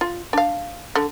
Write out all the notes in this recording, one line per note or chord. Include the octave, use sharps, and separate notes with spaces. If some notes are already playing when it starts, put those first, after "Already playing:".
F4
D4 F5
D3